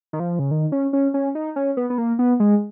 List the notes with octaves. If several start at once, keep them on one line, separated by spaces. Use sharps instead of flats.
D#3
F3
C#3
D#3
C#4
C#4
C#4
D#4
C#4
B3
B3
A#3
B3
G#3